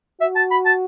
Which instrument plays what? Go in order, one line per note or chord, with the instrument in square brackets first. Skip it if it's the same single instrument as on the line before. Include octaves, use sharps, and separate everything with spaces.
[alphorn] F#4 [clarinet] E5
[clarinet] A5
B5
A5